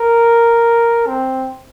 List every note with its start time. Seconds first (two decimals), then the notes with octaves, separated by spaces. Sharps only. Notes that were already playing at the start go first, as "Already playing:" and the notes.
Already playing: A#4
1.07 C4